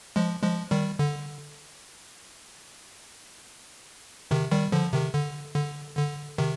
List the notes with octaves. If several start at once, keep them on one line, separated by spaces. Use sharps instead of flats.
F3 G#3
F3 G#3
D#3 G3
D3
C3 D#3
D#3 G3
D3 F3
C3 D#3
D3
D3
D3
C3 D#3